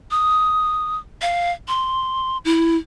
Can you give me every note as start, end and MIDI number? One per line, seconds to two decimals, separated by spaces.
0.11 0.98 87
1.22 1.52 77
1.68 2.38 84
2.45 2.76 64